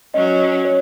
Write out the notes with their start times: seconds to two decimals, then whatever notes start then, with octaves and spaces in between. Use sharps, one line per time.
0.14 F#3 C#4 D#5
0.65 C#5